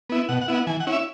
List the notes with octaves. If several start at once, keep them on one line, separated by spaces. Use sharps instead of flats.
B3 E4
B2 F#5
F#5
B3 E4
F#5
E3 G#5
F#5
C#4 E4
E5